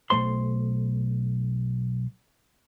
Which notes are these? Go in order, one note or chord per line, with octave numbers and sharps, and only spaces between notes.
B1 B2 A3 C5 C6